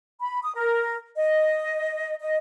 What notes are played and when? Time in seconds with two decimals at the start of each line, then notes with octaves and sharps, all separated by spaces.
0.20 B5
0.43 D#6
0.55 A#4
1.16 D#5
2.20 D#5